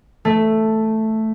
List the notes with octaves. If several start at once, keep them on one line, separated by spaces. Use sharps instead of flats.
A3